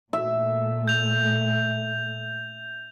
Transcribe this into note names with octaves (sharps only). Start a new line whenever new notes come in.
A#2 A3 E5
G6 F7